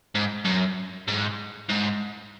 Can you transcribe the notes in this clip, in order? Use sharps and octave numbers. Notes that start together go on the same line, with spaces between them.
G#2
F#2
G#2
G#2